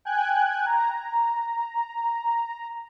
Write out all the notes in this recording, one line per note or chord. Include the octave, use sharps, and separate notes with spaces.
G5 G#5 F#6 G#6
A#5